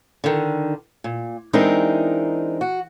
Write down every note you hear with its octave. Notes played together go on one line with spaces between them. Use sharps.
D3 D#3
A#2
E3 G#3 C4 D4 D#4 A#4
F#4